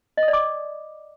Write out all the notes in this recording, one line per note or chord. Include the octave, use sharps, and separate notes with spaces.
D#5
D#6
D5
D6